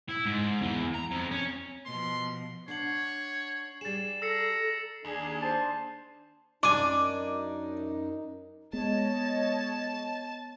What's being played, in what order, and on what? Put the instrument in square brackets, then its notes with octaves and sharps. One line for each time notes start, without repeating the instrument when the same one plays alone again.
[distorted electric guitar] E4
G#2
E2
A#5
F2
C#4
[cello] B2 F3 [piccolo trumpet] C6
[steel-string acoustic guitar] D4 F#5 [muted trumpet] C#5 [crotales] C7 F#7
[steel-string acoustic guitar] G3 G#4 [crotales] A6 E7
[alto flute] A4 [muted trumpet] A#5 [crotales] E6 C7 C#7
[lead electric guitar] D#2 [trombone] D4 [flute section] G#4
[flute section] C5 [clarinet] A5
[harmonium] F#2 D#4 [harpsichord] D4 G#5 [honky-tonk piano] D6
[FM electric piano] G#3 [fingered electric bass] B3 [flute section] C#5 D#5 [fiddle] A5